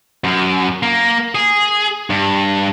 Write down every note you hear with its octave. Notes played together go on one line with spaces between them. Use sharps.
F#2
A#3
G#4
G2